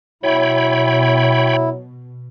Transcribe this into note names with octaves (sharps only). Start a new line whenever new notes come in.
B2 F#3 E4 C#5 G5 B5